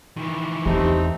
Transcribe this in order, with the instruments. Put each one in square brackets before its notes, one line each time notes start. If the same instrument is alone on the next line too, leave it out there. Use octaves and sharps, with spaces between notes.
[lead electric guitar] D#3 E3
[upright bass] E2 [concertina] A3 C4 D#4 [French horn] G4